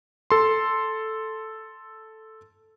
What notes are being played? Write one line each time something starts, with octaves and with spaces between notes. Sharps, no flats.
A4 C6